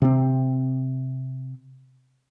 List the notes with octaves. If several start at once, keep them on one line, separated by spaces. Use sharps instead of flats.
C3 C4